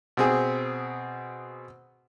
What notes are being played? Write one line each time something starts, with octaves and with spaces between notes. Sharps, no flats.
B2 C4 G#4